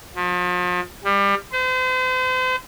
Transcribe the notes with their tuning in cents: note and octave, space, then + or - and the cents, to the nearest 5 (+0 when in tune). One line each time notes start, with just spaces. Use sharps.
F3 +40
G3 +25
C5 -40